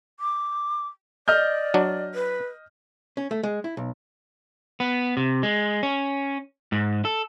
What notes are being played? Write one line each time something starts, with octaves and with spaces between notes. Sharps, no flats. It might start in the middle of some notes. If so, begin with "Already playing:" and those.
D6
D5 D#5 F6 G6
F#3 D4
B4
C#4
A3
G#3
E4
B1
B3
C3
G#3
C#4
G#2
A4